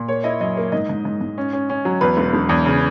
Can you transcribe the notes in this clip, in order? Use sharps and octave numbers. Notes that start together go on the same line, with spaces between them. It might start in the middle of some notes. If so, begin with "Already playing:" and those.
Already playing: A#2
A#3 C#5
E4 D#5
F#2 D#5
A#3
G#2 D#5
G#2
G#2
G#2
C#4
C#4
C#4
F#3
E2 B4
E1
E1
E2
C#3